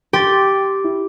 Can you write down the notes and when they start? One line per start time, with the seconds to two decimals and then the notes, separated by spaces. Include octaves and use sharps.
0.13 G4 G5 C6 A6
0.84 E4